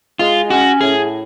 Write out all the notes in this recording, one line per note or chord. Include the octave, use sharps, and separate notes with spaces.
G#3 F4
C#4 F#4
A2 G#4